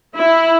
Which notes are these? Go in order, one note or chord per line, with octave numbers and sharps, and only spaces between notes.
E4